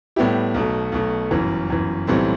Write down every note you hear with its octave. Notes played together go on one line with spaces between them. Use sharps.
A2 G3 B3 E4 G4
B1 B2 A3
B1 B2 A3
G1 F#2 E3
G1 F#2 E3
B1 A2 E3 G3 C4